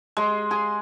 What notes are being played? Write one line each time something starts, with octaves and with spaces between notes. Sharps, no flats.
G#3
G#4